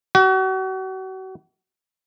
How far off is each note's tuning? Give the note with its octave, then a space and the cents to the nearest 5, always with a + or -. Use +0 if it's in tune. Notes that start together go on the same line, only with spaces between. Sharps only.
F#4 +35